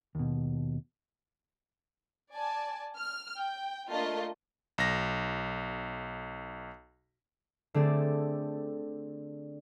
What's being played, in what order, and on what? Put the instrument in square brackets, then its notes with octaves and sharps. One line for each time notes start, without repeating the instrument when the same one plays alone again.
[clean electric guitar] D#2 B2
[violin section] D5 G#5 A5
F6
G5
A3 A#3 D4 F4 D#5 A5
[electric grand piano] B1 A#6
[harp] D3 A3 C4 G#4 A4 D5